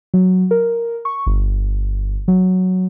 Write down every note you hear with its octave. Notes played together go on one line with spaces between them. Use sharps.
F#3
A#4
C#6
G1
F#3